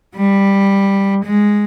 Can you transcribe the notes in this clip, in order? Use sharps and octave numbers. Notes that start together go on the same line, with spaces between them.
G3
G#3